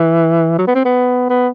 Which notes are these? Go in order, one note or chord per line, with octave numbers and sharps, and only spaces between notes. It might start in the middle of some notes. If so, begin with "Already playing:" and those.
Already playing: E3
F#3
B3
C4
B3
B3